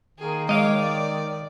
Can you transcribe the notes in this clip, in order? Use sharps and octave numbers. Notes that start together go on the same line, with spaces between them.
D#3 A#3 G#4
G#3 C#5 D#5 F5 D6
D5